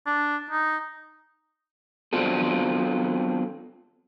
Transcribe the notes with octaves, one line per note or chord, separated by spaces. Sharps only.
D4
D#4
F#3 B3 C4 D4 F4 A4